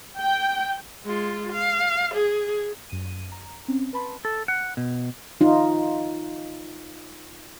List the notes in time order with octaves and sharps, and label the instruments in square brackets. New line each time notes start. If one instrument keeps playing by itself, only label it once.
[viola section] G5
[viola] G#3 F4
F5
G#4
[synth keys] F#2 D#7
A#5
C4 C#4
B4 A5 B5 C6
[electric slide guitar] A4
F#5
B2
[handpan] D#4 F4